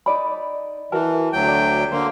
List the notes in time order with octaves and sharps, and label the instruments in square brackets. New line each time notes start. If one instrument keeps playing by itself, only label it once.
[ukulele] D#4 D5 B5
[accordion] E3 [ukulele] F#4 A#4 A5
[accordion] D2 F#3 G5
[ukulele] D5
[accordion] D3 A#3 [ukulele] C5